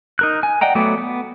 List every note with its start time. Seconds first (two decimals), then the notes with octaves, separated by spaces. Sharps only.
0.19 D#4 A#4 F#6
0.43 G#5
0.61 D5 D#5 F#5 G5 A#5
0.75 F#3 A3 B3 D5
0.98 B3